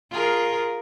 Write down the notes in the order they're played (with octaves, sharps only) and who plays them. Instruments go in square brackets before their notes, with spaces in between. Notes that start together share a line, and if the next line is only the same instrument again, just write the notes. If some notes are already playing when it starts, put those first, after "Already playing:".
[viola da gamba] F4 G#4 A#4